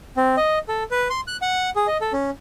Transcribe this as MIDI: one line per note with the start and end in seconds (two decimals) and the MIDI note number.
0.17 0.36 60
0.37 0.59 75
0.68 0.83 69
0.91 1.08 71
1.10 1.21 84
1.27 1.37 90
1.42 1.70 78
1.76 1.87 68
1.87 1.97 75
2.01 2.12 69
2.13 2.30 61